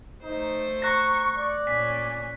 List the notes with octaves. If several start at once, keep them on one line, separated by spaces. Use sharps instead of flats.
A3 D#4 C5
A#5 C#6 F#6 A#6
D5
A#2 C#4 G#5 B6